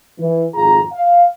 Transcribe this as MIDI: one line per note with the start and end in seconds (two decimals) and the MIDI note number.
0.19 0.47 52
0.55 0.82 32
0.55 0.82 41
0.55 0.82 65
0.55 0.82 68
0.55 0.82 82
0.93 1.24 77